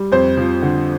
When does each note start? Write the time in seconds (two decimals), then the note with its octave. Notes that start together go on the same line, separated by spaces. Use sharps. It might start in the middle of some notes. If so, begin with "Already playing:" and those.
Already playing: G3
0.12 F2 C5
0.37 F3
0.62 D3